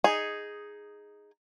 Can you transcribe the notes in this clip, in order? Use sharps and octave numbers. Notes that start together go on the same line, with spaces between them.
D#4 G#4